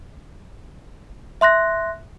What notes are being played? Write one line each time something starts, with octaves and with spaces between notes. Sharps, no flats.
E5 C6 F#6 A#6